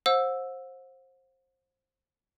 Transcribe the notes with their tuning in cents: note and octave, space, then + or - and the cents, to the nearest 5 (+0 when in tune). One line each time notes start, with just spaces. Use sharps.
C5 +20 F#5 -40 E6 +0